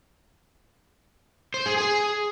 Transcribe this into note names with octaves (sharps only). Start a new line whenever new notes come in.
C5
G#4
G#4